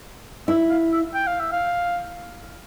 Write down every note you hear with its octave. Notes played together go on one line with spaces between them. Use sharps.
E4 E5
F5
E5
G5
F5
E5
F5